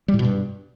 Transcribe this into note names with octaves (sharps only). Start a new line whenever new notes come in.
G3
A2
B2
G2